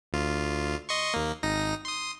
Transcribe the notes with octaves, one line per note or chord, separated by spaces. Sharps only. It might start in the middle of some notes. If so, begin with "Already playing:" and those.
D2 F4
D#5 C6 C#6
D#2 A#3
G#1 D#4 A#6
C6 D#6